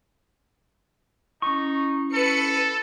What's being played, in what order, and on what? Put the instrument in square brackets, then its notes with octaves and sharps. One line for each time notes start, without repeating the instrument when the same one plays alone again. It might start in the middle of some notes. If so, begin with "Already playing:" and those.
[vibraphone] C#4 E4 [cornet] D#4 [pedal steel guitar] C#6
[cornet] A4 [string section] B4 C#7